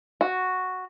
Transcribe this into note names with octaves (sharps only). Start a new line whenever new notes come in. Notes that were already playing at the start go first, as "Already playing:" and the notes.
F#4